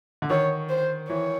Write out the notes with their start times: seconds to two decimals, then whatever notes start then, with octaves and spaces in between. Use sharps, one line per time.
0.22 D3
0.30 D#3 C#5
0.69 C5
1.09 E3 C#5